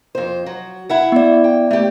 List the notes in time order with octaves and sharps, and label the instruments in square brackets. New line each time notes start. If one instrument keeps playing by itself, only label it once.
[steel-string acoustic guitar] F2 C5
F#3
E4 E5 F#5
[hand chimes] B3 D5
[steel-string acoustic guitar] G5
A3 G4